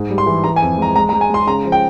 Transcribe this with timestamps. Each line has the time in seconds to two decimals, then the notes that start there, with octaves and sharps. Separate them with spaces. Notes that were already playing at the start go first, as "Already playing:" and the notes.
Already playing: G#2
0.10 G3
0.18 C6
0.26 E3
0.44 E3 A#5
0.56 G#5
0.62 F2
0.78 G#3 A#5
0.96 G#3 A#5
1.09 A#5
1.13 G#3
1.21 G#5
1.30 G#3 C6
1.47 C#3 A#5
1.65 F3
1.72 G5